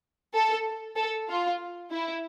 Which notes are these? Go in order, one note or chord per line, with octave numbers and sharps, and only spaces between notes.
A4
A4
F4
E4